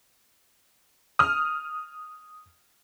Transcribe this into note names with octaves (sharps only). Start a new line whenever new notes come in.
D#6 F6